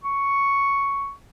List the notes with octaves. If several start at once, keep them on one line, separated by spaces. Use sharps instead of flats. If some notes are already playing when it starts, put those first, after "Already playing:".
C#6